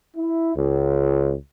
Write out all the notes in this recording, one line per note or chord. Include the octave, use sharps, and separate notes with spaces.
E4
C#2